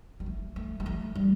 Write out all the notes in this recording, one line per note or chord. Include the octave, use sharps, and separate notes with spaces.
G3
A3
A3
G3
A3
G3